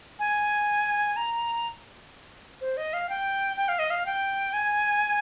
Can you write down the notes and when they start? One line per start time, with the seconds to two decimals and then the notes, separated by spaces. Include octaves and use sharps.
0.19 G#5
1.16 A#5
2.61 C5
2.77 D#5
2.93 F5
3.09 G5
3.57 G5
3.68 F5
3.79 D#5
3.90 F5
4.06 G5
4.53 G#5